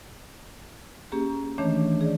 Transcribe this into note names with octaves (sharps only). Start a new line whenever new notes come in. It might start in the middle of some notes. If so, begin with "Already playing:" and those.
A#3 C#4 G4 G#4
D#3 E3 A3 C#4 D4 C#5
G#4 D5